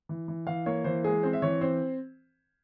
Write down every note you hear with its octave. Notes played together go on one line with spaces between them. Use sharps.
E3
E3
E3 F5
A#3 C#5
E3 C5
G#3 G#4
C4 C5
E5
E3 C#5
C4 C5